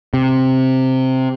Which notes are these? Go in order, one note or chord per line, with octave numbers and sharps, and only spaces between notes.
C3